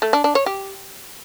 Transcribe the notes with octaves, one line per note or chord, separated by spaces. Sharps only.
A3
D4
D4
C#5
G4